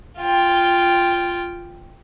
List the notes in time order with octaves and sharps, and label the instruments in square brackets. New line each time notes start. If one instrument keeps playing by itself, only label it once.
[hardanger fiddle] F4 G5